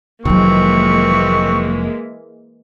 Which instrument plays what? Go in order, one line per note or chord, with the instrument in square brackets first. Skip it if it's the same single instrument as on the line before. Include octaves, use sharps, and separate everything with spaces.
[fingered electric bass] F1 [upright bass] D#3 F#3 [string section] E3 G#3 A#3 [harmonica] C4 C#6